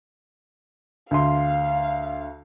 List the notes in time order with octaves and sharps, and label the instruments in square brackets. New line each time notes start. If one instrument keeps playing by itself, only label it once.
[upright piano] D2 C6 [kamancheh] F5